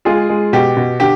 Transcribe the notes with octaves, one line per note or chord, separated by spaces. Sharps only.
G#3 F4 G#4
G#3
B2 G4
B2
D3 G4